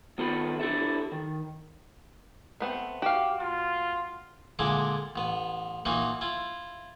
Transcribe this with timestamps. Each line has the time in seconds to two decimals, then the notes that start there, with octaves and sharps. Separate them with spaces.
0.18 D#3 B3 F4 A4 B4 B5
0.60 D4 E4 G4 A4 E5
1.12 D#3
2.60 A3 B3 C4
3.02 F#4 G4 F5
3.40 A#2 F4
4.59 A#2 D3 G#3 D4 E4
5.16 A1 B3
5.85 A#2 E3 A#3 D#4 F#4
6.21 E4 F4